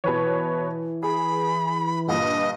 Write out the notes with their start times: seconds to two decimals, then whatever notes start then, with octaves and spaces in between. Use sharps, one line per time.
0.04 B2 E3 B4 C#5
1.03 G#4 B5
2.08 G2 A#2 D3 D#5